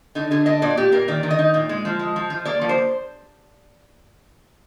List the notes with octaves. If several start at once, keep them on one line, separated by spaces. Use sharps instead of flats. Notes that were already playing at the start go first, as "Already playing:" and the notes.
D3 D#4
D3 G#4
D4 D#5
A#2 D5
A#2 G4
A#2 A#4
D#3 D5
D#3
D#5
D#4
A#2
G#3
F3
G#3
F3
F3
A#3 D5
F3
C5